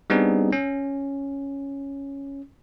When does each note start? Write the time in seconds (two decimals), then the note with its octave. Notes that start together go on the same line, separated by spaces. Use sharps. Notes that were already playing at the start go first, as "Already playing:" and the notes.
0.10 G3 B3 C4 D4 D#4 G#4
0.52 C#4